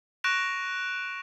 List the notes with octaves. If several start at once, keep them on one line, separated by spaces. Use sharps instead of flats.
C#6 F#6 A#6 D7 E7 F7